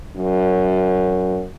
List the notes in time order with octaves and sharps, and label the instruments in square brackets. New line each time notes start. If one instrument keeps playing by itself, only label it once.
[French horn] F#2